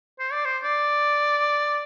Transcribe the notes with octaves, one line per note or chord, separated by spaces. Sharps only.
C5
D5
C5
D5